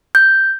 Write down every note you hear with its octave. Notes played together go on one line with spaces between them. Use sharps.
G6